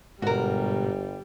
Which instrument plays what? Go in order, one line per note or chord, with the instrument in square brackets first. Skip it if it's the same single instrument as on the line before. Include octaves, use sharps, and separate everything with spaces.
[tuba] G1 [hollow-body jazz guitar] G#2 B2 [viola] G3 [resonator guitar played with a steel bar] F#4 A#4